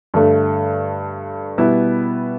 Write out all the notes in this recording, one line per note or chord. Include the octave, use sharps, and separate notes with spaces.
G2 D3 A3
B2 G3 B3 E4